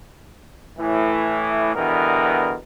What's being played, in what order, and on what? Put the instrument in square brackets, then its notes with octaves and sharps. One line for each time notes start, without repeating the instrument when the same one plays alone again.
[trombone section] A2 E3
B2 D3 E3 G3 B3 A#4